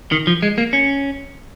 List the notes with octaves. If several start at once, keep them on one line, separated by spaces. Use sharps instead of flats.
D#3
F3
G#3
A#3
C#4